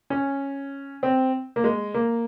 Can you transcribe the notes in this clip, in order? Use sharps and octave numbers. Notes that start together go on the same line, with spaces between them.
C#4
C4
A#3
G#3
A#3